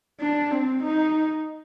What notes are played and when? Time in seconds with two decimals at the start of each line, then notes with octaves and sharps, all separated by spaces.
0.20 D4
0.51 C4
0.83 D#4